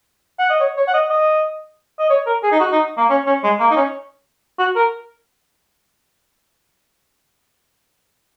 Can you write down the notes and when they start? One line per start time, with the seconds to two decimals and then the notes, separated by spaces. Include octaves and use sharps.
0.39 F#5
0.50 D#5
0.60 C#5
0.77 C#5
0.87 F#5
0.94 D#5
1.10 D#5
1.99 D#5
2.10 C#5
2.26 A#4
2.43 G#4
2.52 D#4
2.60 F#4
2.72 D#4
2.97 A#3
3.09 C#4
3.26 C#4
3.43 G#3
3.60 A#3
3.71 D#4
3.76 C#4
4.59 F#4
4.76 A#4